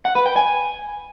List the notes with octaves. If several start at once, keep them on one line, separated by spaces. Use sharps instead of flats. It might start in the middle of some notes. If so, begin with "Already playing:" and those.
F#5
B4
G5
G#5